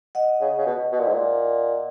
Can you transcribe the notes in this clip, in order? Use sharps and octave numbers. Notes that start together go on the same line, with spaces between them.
D#5 F#5
C#3
C#3
B2
B2
A#2
G#2
A#2